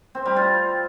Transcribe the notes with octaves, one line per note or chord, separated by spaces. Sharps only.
C4
G3
F4